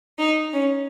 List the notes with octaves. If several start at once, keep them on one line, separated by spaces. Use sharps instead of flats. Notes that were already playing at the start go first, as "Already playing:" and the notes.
D#4
C#4